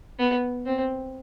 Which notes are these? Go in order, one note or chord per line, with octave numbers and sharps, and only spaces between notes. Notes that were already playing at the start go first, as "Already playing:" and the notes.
B3
C4